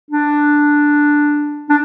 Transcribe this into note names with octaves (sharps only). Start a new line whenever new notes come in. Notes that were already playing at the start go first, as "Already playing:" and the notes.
D4
D4